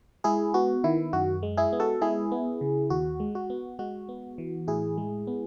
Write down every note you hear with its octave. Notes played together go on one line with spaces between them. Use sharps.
G#3 E4 G#4
B3 F#4
D#3 E4
F#2 F#4
G#3
E4 G#4
B3
F#4 A4
G#3 E4 G#4
B3
C#3
D#2 F#4
G#3
F#4
B3
G#3 F#4
B3
E3
A2 E4 G#4
G#3
B3